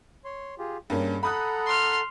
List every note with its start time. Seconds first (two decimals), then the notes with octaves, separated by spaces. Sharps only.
0.25 C#5 C6
0.59 F4 G4 G#4
0.90 G2 A#3 C#4 G#4
1.23 A4 F#5 A#5 B5 D#6 F#6
1.66 C6 F6